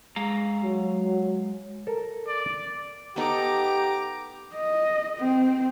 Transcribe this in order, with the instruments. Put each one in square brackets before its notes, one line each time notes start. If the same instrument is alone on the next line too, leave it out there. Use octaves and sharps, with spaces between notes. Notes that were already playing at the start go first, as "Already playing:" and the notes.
[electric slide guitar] G#3 F5 A#5
[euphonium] F#3
[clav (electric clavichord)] A4 A#4
[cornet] D5
[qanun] B3 D#4 A4 [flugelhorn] G4 [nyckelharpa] A#5 D6
[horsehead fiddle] D#5
C4